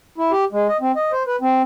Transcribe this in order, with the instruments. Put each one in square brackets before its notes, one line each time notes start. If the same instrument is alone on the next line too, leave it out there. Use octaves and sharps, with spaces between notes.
[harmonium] E4
G4
G#3
D#5
C4
D#5
C5
B4
C4